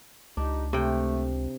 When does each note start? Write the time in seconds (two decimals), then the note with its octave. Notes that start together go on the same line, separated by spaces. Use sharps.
0.37 C#2 D4 D#4 G4
0.73 C3 A3 G5